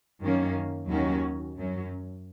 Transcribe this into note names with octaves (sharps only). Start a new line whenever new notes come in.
F#2 D#3 A#3 C#4
D#2 D#3 F#3 C#4 F#4
F#2 F#3 C#4